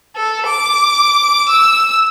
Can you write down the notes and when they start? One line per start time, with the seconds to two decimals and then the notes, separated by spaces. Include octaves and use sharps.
0.16 A4
0.46 D6
1.48 E6